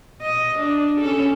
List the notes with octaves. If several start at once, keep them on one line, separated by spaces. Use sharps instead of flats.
D#5
D4
C#4 A4